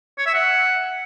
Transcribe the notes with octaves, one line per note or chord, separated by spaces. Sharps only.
C#5
E5
F#5